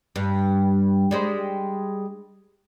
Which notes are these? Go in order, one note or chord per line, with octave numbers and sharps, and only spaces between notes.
G2
G3 G#3 C5